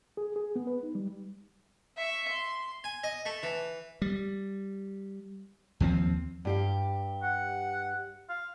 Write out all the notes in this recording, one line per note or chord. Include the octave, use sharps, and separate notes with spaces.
G#4
G#4
B3
B4
D#4
G3
E5 C#6
C6
G#5
D#5
A3
E3
G3
D#2 F3 G3 C4
G2 G4 F5
F#5
F5